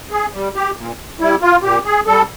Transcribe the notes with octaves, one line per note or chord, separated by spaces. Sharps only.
G#4
G3
G4
A#2
G3 E4
F4
A#2 G4
G#4
G3 A4